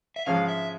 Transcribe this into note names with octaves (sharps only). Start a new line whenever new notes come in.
E5
G#2 F3 G#3 C#4 F5
E5